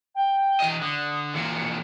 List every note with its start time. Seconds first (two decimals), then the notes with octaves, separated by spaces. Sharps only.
0.15 G5
0.60 E3 D#5
0.82 D3 D#6
1.35 E3 F3 A#3 C#7